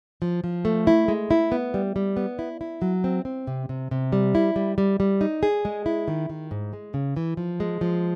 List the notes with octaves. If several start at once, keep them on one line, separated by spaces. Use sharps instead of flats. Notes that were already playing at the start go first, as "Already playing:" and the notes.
F3
F3
A3
E4
G#3
E4
B3
G3
G3
B3
E4
E4
F#3
C4
C4
C3
C3
C3
G3
E4
G3
G3
G3
D#4
G#4
G#3
E4
D#3
D#3
G#2
G#3
C#3
E3
F3
G#3
F3